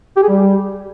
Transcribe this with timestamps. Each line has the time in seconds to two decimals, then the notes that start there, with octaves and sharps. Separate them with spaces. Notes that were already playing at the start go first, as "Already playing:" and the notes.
0.17 G4
0.23 G#4
0.28 G3